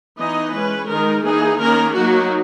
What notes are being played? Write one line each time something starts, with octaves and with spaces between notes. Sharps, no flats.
E3 B3 D#4 D#5
G#3 C#4 B4
D#3 G#3 D#4 A#4
E3 A#3 D#4 G#4
D#3 A#3 C#4 A#4
F#3 A#3 D#4 F#4